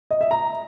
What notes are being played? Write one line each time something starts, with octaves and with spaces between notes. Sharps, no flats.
D#5
E5
A#5